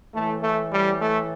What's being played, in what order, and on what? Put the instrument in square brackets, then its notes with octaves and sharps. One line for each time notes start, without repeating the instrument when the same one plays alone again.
[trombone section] A2 E3 A3
A3
G3
A3